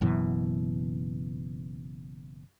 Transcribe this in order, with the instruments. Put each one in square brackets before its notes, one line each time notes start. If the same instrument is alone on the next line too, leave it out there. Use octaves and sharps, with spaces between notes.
[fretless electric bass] F#1 F#2 B2 E3